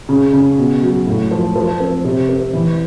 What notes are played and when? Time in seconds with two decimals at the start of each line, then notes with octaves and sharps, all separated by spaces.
0.09 C#3
0.33 C#3
0.58 B2
0.82 F#3
1.07 A2
1.31 F3
1.56 F3
1.80 C4
2.05 C3
2.29 C4
2.53 E3